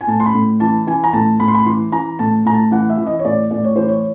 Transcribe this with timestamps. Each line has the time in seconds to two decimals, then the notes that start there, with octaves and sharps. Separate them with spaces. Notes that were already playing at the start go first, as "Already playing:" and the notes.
0.01 G#5
0.07 A2 A5
0.20 C6
0.26 B5
0.34 A2
0.60 E3 A5
0.87 E3 G#5
1.04 A#5
1.13 A2 A5
1.40 A2 B5
1.48 C6
1.55 B5
1.66 E3 C6
1.92 E3 A#5
2.19 A2 A5
2.45 A2 A#5
2.54 A5
2.71 E3 F#5
2.90 E5
2.98 E3
3.07 D#5
3.19 C#5
3.25 A2 D5
3.51 A2 D5
3.64 C#5
3.76 E3 C5
3.88 C#5